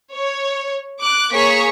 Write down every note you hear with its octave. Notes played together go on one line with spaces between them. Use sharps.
C#5
D6 F#6
A#3 G#4 C#5 C#6 B6